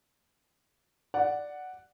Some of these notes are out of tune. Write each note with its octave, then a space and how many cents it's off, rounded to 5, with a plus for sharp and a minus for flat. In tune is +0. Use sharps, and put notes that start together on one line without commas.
D5 +0 F#5 +0